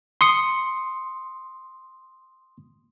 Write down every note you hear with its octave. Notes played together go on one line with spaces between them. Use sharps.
C6 D#6 C#7